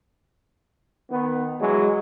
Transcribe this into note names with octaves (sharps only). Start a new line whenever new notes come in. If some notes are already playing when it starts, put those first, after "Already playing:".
D#3 B3
E3 F#3 G#3